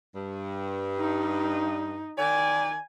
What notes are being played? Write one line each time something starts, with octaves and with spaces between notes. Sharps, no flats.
G2
D#4
D#3 D5 G#5